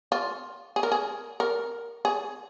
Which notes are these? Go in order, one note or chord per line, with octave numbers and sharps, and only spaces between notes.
F4
G#4
A#4
G#4
A#4
G#4